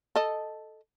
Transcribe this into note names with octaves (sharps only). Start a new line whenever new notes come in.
A4 D#5